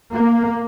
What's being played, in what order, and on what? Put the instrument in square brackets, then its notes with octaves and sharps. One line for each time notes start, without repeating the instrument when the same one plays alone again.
[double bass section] A#3